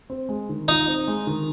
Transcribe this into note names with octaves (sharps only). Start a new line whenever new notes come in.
C4
G#3
D#3
D#4 F4
C4
G#3
D#3